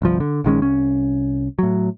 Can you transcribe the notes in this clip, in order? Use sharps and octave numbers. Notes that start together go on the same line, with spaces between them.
G1 C2 F3
D3
A#1 D#3 G#3 C#4
C2 C#4
A2 F#3